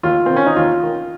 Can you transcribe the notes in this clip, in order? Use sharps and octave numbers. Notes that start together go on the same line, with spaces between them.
D#2 F4
D#3 C4
C#4
D#4
D#2 F4
D#3